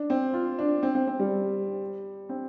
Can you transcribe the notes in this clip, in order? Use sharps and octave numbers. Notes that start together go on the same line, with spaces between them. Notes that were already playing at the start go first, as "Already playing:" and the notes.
Already playing: D4
C4
F4
D4
C4
C4
C4
G3
C4